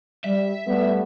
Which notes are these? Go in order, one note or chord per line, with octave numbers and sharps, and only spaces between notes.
G3 E5
G3 A3 B3